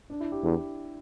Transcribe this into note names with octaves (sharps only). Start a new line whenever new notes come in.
D4
E4
G4
E2